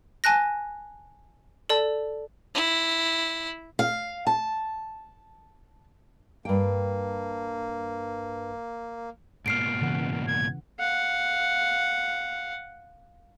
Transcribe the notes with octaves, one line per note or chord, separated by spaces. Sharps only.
G#5 A5 F#6 A#6
A4 D5 A5
E4
F5
A5
G2 A#3 G5
G#2 B2 A#3 F6 C7 D7
C#3 E3 F#5
G#6
F5 F#5